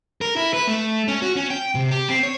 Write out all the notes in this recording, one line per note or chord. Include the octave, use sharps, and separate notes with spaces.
A#4
E4
B4
A3
C#4
F#4
C#4
G5
C3
G4
C4
C#5